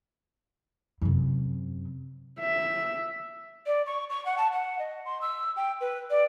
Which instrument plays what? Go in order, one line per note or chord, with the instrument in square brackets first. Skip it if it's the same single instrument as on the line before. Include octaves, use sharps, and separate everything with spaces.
[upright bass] F#2 C3
[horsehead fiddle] E5
[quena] D5
C#6
C#6
F#5
A5
F#5
D#5
C6
E6
G5
B4
D5